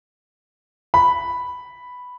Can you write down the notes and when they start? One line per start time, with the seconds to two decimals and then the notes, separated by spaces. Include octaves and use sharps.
0.94 B5